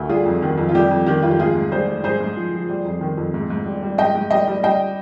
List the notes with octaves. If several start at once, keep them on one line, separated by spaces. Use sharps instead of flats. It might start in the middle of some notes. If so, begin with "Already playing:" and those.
Already playing: D2
G3 F4 G#4
F2
D#3
F2
F4
G3 G4
F2
D#3 G4
F2 F4
G4
G#2 F4 G#4
G#2
G3 G#4 C5
G3
G#2 G#4 C5
G#2
F3
F3
G3
F2
D#3
F2
G#2
G#2
G3
G3
G#2 D#5 G5
G#2
G3 D#5 G5
G3
G3 D#5 G5